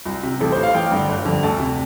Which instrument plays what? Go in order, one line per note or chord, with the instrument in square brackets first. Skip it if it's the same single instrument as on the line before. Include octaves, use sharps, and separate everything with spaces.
[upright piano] C2
C3
A1 A4
C5
A2
F5
A1 G5
G2 D3
G1
F2 D3
D2 A5
C3